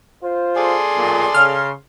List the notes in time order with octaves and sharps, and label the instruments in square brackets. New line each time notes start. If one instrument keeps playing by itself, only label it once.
[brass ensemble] F4 C5
[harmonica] G#4 A4 D5 [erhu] C6
[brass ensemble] B1 A#2
[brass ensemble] C#3 [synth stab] F6